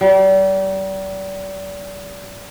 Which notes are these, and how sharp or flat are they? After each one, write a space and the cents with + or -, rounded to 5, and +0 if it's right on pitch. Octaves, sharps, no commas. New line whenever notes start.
G3 -35